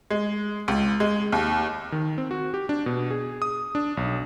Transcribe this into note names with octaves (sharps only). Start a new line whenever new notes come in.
G#3
C#2
G#3
D#2
D#3
C4
F#4
G4
D4
B2
G#4
D#6
D4
B1